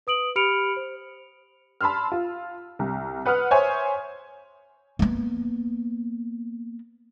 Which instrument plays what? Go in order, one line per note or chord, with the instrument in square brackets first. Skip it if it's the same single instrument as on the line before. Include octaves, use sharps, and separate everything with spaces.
[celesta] B4 D#6 D7 F#7
G4 B5 F6 C#7 D7 F7
C5
[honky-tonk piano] A5 B5 C6 E6 F6
F4
C2
B4 F#5 D#6 F6
C5 C#5 E5 G#5
[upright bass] A#3 B3